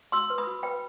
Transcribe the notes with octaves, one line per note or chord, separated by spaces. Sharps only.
F#4 C6 E6
B4
B5 D#6
F#4
B4 G5 B5